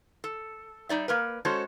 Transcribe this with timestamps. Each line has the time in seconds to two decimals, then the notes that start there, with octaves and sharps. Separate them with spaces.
0.24 A4
0.89 G3 D#4 D5 E5
1.08 A#3 A#4 B4
1.45 G#3 C#4 F#4 A4 C5 C#5